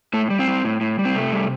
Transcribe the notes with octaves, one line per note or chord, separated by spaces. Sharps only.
A2 A3
G3
C4
G3
A2
A2
G3
C4
C3 A3
G3